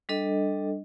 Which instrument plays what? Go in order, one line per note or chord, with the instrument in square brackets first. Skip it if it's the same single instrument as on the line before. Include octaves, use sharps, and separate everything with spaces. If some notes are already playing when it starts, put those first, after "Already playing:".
[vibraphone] G3 D4 A4 D#5